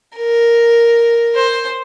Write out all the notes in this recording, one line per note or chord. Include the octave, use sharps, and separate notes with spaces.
A#4
C5